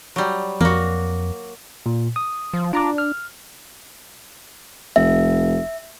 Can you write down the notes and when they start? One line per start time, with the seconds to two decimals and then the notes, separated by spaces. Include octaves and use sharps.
0.16 F#3 G3
0.61 F2 A#3 F#4
1.86 A#2
2.16 D#6
2.53 F3
2.73 D4 F4 A#5 D6
2.98 F6
4.96 F1 E5